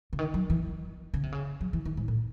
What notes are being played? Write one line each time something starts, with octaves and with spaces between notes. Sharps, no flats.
C#3
D#3
F#3
E3
C#3
C3
C#3
F#3
E3
D#3
G#2
A2